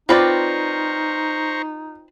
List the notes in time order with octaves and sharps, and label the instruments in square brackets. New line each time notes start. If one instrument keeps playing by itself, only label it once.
[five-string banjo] C4 B4 D5 [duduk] D#4 [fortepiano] F4 [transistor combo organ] C5 A#5 C#6